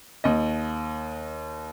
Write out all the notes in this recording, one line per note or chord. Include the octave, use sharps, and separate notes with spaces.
D#2 D#5